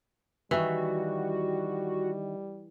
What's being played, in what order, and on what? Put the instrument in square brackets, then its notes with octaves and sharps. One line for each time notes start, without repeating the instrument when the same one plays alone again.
[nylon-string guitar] D#3 E5 [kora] E3 [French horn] G3 [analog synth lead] F#4